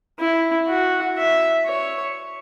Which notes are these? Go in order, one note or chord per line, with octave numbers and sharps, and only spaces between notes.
E4
F#4
E5
C#5